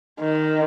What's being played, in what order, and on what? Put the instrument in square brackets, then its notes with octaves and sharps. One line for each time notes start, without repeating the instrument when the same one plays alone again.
[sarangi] D#3